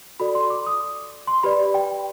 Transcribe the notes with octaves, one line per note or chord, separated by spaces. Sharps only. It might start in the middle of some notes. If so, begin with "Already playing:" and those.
F#4 A4 D5 B5
C6
D6
D#6
C6
G4 B4 D5 B5
G5